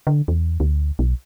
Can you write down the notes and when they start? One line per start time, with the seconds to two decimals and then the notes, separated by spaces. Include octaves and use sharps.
0.07 D3
0.28 E2
0.60 D2
0.99 B1